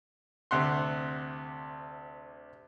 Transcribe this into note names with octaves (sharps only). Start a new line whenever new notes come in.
D2 C3 F#5 C6